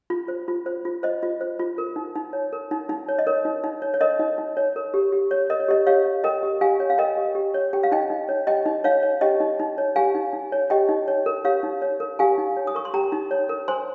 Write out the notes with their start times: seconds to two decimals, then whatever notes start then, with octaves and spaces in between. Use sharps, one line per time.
0.10 F4
0.28 C5
0.48 F4
0.66 C5
0.85 F4
1.03 C5 D#5
1.23 F4
1.41 C5
1.59 F4
1.78 A#4
1.96 D#4
2.15 D#4
2.33 C#5
2.53 A#4
2.71 D#4
2.89 D#4
3.09 C#5
3.19 D#5
3.27 A#4 C#5
3.45 D#4
3.64 D#4
3.82 C#5
3.94 C#5
4.01 A#4 D#5
4.19 D#4
4.38 D#4
4.57 C#5
4.76 A#4
4.94 G4
5.12 G4
5.31 C#5
5.50 A#4 D#5
5.60 C#5
5.68 G4 D#5
5.87 G4 C#5 F5
6.05 C#5
6.24 A#4 D#5 G5
6.43 G4
6.61 G4 F5 G#5
6.80 C#5
6.90 F5
6.98 A#4 D#5 G5
7.17 G4
7.35 G4
7.54 C#5
7.73 G4 G5
7.83 F5
7.92 D#4 D#5 G5
8.10 D#4
8.29 C#5
8.47 G4 D#5 G5
8.66 D#4
8.84 D#4 C#5 F5
9.03 C#5
9.21 G4 D#5 G5
9.40 D#4
9.59 D#4
9.78 C#5
9.96 G4 F5 G#5
10.15 D#4
10.33 D#4
10.52 C#5
10.70 G4 D#5 G5
10.89 D#4
11.08 C#5
11.26 A#4
11.44 G4 C#5 F5
11.63 D#4
11.82 C#5
12.00 A#4
12.19 G4 F5 G#5
12.38 D#4
12.57 C#5
12.67 D#6
12.75 A#4 C#6
12.85 C6
12.94 G4 G5 A#5
13.12 D#4
13.31 C#5
13.49 A#4
13.68 C5 G#5 C6